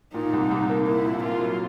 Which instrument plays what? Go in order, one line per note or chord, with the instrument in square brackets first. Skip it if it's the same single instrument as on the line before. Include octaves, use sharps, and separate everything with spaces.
[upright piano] A#2 [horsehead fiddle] D#4
[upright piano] C2
C2
A#3
[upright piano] A#3 [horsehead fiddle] E4
[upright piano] A#2
[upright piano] A#3 [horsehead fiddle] F4
[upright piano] F#3